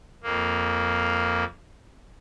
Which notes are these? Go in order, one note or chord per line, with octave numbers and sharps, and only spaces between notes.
F2 A#3